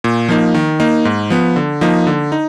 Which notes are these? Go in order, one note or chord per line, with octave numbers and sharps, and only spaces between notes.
A#2
F3 A#3 D#4
D#3
A#3 D#4
G#2
F3 B3
D3
F3 A#3 D#4
D3
D#4